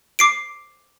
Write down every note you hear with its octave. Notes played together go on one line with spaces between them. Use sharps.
D6 C7 D7